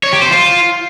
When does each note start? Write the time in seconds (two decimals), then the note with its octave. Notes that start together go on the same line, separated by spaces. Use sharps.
0.03 C#5
0.13 G4
0.22 C5
0.31 F4